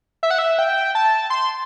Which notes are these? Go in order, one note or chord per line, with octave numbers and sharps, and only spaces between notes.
E5
F#5
E5
G5
A5
C6